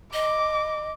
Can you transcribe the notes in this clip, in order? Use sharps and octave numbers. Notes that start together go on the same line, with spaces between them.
D#5 D6